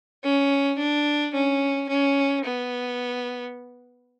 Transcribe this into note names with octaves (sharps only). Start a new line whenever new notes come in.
C#4
D4
C#4
C#4
B3